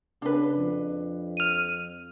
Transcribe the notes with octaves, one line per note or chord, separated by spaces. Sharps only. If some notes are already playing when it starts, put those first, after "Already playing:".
C#3 D4 B4
F2
F6 D#7